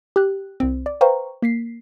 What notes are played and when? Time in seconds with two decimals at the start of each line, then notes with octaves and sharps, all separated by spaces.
0.16 G4 F#6
0.60 C2 C4
0.86 D5
1.01 B4 C5 F5 G5 A#5 C#6
1.42 A#3 B6 C7